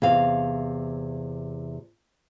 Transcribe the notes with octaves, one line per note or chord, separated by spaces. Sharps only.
E2 C3 F5